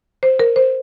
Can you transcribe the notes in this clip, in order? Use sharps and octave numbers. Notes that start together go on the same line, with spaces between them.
C5
A#4
C5